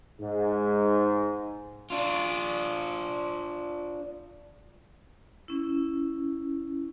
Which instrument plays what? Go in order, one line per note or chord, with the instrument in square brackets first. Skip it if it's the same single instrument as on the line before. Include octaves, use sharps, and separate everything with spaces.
[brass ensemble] G#2
[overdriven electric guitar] D4 F4
[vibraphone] C#4 E4